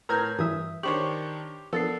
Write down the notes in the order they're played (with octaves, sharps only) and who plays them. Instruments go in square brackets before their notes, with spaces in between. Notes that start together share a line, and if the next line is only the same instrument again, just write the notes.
[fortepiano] A2 [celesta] A#4 B4 G6 [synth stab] A#5 F6 G#6
[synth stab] G2 E3 E5 [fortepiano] D#6
[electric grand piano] D#3 D4 C#6 [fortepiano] G4 C5 C#5 [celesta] F#7
[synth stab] F3 [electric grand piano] B3 D4 [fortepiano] A4 [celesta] A#4 A6 C7